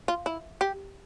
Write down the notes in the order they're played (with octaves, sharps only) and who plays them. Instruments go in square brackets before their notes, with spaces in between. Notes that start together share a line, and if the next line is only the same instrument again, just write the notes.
[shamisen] F4
E4
G4